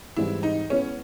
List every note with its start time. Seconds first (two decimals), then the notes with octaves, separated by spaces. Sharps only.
0.16 G#2 E3 G3 C4 E4
0.43 D#4
0.70 G#3 B3 C#4 E4 G#4 C#5